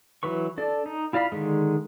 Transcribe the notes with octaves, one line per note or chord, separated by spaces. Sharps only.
E3 F#3 B4 C#6
D4 A4 D5
D#4
E4 F4 D5 F5 B5
D3 D#3 G#3